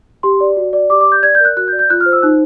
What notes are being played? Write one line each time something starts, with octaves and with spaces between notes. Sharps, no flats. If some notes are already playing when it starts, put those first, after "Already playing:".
G4 C6
D5
F#4
D5
G4 D6
D6
D5
G6
D5 G#6
G6
A#4 F#6
F#4 F#6
G6
D5
G6
F4 F#6
F6
C5
E6
D#4 F#6